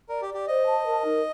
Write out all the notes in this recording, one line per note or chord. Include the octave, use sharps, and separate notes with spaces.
A#4 D5
G4
D5
G4
C5 D#5
A5
A#4
D#4